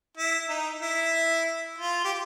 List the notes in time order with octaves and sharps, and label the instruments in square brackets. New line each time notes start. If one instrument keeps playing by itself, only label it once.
[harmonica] E4
D#4
E4
F4
G4